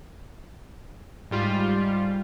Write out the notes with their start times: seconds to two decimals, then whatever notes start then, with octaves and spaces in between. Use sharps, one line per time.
1.31 G#2 G3 F4